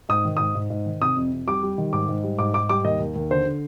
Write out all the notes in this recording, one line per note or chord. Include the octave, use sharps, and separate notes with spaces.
G#2 D#6
D#3
G#2 D#6
G#2
G#2
D#3
C3 D#6
F2
F2
G3 D6
G3
D#3
G#2 D6
G#2
G3
G#2 D6
G#2 D6
G3 D6
D#2 D#5
D#2
D#2
D3 C5
D3